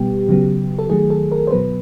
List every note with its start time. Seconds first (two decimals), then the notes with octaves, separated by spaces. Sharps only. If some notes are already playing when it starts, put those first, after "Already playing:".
Already playing: B2 G3 B3 G4
0.28 C#3 F#3 B3
0.79 A4
0.90 D#3 F#3 A3 G#4
1.10 A4
1.32 A#4
1.47 C5
1.51 B2 F#3 B3 B4